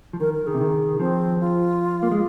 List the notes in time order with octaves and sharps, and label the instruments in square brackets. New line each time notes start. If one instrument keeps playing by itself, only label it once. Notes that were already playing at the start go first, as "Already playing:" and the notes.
[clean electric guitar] F3
[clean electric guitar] D#3 [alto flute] A#4
[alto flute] A#4
[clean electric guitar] D#3 [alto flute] G#4
[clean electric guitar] C3
D#3
[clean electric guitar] F3 [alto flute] C4
[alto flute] F4
[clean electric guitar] A#3
G#3